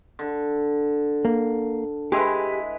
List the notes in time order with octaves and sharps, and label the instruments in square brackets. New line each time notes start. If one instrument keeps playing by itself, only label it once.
[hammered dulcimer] D3
[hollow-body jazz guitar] A#3
[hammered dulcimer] G#3 E4 B4 [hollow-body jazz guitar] G4 G#4